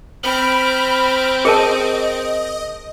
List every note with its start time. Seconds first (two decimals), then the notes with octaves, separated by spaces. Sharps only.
0.23 C4 B5 F6
1.45 G#4 A#4 D#5 A5